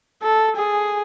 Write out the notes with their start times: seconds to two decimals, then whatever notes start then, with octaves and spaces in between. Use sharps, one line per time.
0.22 A4
0.56 G#4